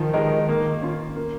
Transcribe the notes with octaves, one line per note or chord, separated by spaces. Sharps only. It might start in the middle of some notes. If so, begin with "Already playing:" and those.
Already playing: D#3 F3
G#3 D#4 G4 A#4
A#3
C#4 F4
A#3